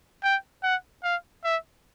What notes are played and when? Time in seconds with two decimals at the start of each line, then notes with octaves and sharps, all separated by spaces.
0.23 G5
0.63 F#5
1.03 F5
1.44 E5